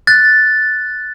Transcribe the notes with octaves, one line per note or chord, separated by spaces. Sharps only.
F#6 A6